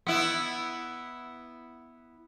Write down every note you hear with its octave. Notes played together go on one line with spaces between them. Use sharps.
B3 E4